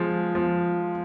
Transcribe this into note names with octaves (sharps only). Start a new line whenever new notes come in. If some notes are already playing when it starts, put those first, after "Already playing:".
Already playing: F3 G#3
F3